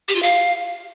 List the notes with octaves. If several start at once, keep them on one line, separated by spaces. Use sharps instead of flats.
G4
F4
F5